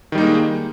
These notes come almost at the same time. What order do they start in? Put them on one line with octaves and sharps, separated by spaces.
D#3 G3 D#4 A#3 G#3